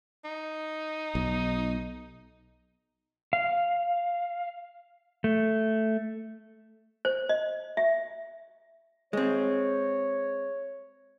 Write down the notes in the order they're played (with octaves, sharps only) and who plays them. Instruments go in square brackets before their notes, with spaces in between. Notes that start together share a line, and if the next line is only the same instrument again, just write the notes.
[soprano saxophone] D#4
[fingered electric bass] B1
[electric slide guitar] F5
A3
[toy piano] C5
D#5
E5
[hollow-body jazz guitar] G#3 C4 [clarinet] C#5